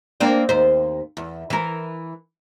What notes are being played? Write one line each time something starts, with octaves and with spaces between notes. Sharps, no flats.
A#3 C4 D4
D#2 C5
E2
E3 A#4